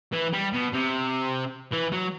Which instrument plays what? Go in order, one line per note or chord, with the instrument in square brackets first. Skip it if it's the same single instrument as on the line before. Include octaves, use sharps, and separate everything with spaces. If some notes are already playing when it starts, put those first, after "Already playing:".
[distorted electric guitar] E3
G3
B2
C3
E3
F#3